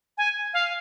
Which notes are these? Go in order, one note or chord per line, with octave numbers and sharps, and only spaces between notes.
G#5
F5